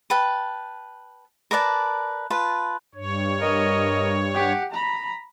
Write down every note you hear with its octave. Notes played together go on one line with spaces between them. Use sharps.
B4 G5 A5
A#4 B4 D5 A5
F4 B4 A5
G2 C#5
A#4 D#5
G4 F#5
A#5 B5